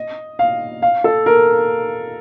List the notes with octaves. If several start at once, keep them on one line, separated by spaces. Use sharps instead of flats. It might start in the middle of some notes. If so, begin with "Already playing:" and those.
Already playing: D#5
F5
F5
A4
A#4